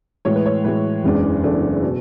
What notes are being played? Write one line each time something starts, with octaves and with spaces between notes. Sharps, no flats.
A2 E3 G#3 C#5
B4
C#5
A2 E3 G#3 B4
F#1 E2 C#3 G#3 D4
F#1 E2 C#3 G#3 D4 A4
B2